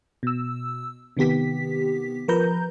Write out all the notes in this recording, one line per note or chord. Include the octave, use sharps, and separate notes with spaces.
B2 E6
C3 D#3 B3 G4 B6
F3 A#4 B4 A#5 G6